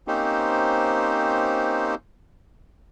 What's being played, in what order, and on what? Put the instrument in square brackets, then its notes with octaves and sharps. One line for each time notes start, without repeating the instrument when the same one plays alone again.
[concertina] A#3 C4 C#4 D#4 G4 C5